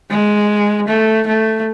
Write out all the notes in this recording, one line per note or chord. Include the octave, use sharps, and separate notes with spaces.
G#3
A3
A3